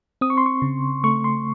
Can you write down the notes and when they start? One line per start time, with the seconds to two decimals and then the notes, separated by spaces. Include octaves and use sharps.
0.21 C4 D#6
0.30 C#6
0.38 C6
0.46 C#6
0.62 C#3
1.04 A3 C#6
1.24 C6